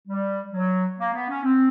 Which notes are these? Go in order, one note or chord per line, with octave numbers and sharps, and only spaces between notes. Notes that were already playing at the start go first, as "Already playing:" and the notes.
G3
F#3
A#3
B3
C#4
C4